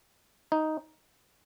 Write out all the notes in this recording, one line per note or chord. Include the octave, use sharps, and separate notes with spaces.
D#4